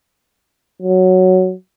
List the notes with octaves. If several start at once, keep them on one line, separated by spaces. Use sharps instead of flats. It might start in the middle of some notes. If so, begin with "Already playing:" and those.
F#3